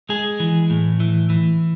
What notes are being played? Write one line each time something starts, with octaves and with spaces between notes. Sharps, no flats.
G#3 G#4
E3
A2
E3
E3